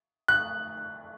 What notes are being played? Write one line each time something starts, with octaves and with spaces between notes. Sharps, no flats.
F#6